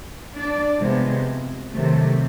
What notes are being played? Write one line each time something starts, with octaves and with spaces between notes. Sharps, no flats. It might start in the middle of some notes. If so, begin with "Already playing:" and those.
D4 D5
C3 F3 G#3 B3
C3 D#3 F#3 A3